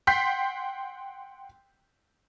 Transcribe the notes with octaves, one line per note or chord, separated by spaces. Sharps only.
F#5 G5 C6 G6 B6 C7